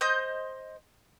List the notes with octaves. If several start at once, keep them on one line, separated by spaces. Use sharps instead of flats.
C5 D#5 D#6 G6